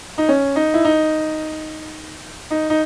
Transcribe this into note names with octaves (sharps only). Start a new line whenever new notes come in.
D#4
C#4
D#4
E4
D#4
D#4
D#4